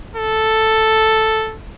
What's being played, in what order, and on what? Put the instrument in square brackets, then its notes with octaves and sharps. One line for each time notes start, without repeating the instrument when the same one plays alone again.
[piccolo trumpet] A4